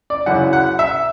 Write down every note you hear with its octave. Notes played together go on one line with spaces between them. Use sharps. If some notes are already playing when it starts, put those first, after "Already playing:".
D5
F#2 C#3 E3 F#5
F#5
E5